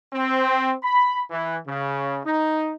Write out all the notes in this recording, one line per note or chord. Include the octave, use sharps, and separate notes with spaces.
C4
B5
E3
C#3
D#4